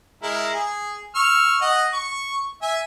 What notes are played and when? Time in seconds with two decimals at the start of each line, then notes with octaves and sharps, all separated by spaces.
0.23 G#3 E4 A#4
0.54 G#4
1.15 C#6 E6 F6
1.61 D#5 F#5
1.93 C#6
2.62 E5 G#5